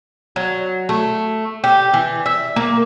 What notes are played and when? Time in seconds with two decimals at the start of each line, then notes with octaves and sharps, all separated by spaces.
0.36 F#3
0.89 A3
1.64 G4
1.94 E3
2.26 E5
2.56 A#3